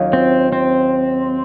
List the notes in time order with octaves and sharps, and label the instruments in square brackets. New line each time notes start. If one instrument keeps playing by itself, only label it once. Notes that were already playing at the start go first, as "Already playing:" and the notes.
Already playing: [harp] D#2 D#3 F#3 C#4 F4
[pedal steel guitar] C4
C4